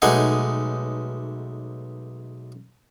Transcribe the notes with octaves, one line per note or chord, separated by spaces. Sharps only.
B1 G#3 A3 D#4 F#5 G#5